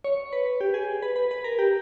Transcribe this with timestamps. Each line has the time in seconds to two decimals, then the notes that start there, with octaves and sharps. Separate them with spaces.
0.04 C#5
0.33 B4
0.61 G4
0.74 G#4
1.02 B4
1.16 B4
1.31 B4
1.44 A#4
1.59 G4